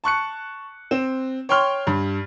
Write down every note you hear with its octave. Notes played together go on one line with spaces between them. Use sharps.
A5 C#6 F#6 C#7
C4 E7
C#5 G5 C6 C#6 F6 G7
G2